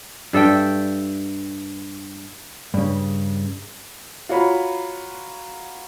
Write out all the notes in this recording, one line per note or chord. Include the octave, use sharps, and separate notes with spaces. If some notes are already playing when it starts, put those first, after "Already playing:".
G2 A4 E5 G5
G2 C#3
F4 F#4 C#5 A#5 B5